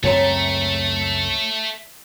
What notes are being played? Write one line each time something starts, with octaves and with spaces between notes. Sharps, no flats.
C#2 F#2 A3 C4 C#5 A#5